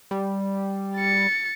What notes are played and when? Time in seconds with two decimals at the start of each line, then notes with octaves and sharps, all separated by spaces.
0.11 G3
0.96 A6 C#7